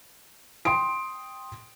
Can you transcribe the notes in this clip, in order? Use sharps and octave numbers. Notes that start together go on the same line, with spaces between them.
G5 C6 D#6 D7